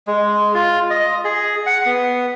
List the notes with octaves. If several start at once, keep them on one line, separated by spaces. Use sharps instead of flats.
G#3
F4
D#5
G#4
F#5
B3